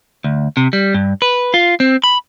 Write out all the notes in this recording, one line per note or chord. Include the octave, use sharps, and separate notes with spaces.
D2
C3
G3
G2
B4
F4
C4
B5